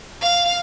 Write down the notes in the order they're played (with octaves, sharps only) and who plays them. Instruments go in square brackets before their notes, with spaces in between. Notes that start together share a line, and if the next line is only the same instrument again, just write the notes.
[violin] F5